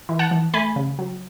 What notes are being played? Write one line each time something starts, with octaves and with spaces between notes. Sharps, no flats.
E3
F#5 A5
E3
A3 G#5 B5
C#3
F#3